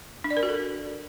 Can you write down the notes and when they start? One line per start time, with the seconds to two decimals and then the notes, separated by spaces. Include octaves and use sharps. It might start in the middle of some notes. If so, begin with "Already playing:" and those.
0.24 D4
0.31 D5
0.37 A#4
0.43 F#4
0.49 A4